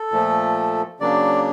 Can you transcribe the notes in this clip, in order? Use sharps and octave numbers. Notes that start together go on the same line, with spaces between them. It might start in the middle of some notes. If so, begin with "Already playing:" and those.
Already playing: A4
A#2 F3 A3
C#3 F#3 A#3 D4 D5